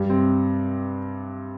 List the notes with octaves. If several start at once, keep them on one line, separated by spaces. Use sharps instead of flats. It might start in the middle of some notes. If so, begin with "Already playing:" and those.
Already playing: G2 G3
C3 C4